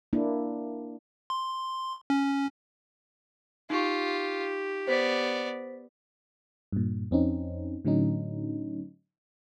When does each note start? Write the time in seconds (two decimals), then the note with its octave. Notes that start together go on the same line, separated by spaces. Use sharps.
0.13 A#3 D4 E4
1.30 C6
2.10 C#4
3.70 D#4 F4 G4 C#6
4.88 B3 C5 D5 B6
6.72 G2 A#2
7.11 F2 C4 C#4 D#4
7.85 A2 D3 F#3 C#4 D#4